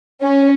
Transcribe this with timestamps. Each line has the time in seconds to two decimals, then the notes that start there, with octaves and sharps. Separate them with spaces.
0.22 C#4